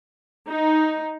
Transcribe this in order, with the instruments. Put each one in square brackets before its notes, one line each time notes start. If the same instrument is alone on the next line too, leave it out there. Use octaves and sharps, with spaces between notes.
[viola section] D#4